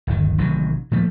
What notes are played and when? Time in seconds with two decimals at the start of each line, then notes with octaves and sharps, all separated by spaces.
0.07 D1 G1 D#3
0.38 A1 C3 D#3 F#3
0.91 A#2 F3 A3